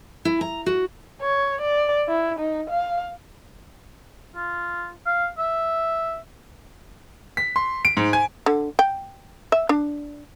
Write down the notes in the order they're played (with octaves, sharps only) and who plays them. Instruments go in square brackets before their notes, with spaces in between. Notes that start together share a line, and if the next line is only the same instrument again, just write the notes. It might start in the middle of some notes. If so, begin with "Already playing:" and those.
[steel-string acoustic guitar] E4
A#5
F#4
[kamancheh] C#5
D5
E4
D#4
F5
[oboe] F4
F5
E5
[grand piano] B6
C6
D7
G#2
G#5
[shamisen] D3
G5
E5
D4